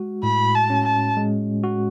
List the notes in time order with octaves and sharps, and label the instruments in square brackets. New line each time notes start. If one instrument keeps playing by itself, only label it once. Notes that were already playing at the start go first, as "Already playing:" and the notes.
Already playing: [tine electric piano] G#3 F#4
[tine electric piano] A2 [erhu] B5
[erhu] A5
[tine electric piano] C#4
[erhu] A5
[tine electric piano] G#3
F#4